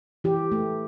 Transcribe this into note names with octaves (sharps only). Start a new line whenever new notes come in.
E3 G4
A3